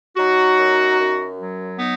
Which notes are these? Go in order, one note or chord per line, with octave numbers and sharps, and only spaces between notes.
F#3 D#4 F#4
F#2
F#2
F#3
B3 D#4